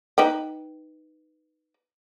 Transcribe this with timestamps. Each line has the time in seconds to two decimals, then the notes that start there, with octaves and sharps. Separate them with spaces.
0.18 D#4 B4 G5